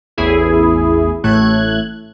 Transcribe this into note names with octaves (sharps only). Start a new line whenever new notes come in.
A1 E2 E4 G#4
A1 A2 A3 F#6 G#6